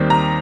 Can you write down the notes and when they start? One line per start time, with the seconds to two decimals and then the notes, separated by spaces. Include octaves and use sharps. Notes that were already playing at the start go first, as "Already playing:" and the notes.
Already playing: D#2 D#3 G3 C4
0.10 A#5